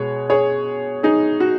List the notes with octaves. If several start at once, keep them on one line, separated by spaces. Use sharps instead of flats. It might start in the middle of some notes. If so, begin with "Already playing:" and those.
Already playing: B2 G#3 B3 G#4 C#5
G#4 C#5
D#4 G#4
F#4